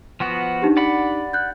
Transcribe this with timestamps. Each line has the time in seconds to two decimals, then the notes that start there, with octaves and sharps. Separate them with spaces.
0.20 F3 B3 F#4
0.62 D4 D#4 G4
0.77 D5 F#5 B5
1.33 F#6 G6